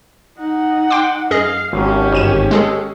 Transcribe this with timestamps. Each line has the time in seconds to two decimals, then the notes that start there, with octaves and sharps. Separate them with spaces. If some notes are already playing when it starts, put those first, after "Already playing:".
0.38 D#4 F#5
0.90 G5 C6 D6
1.31 F#2 G#4 D#5 F5
1.73 G#1 C#4 G4
2.12 G1 D#7 E7
2.51 G#3 G#4 A4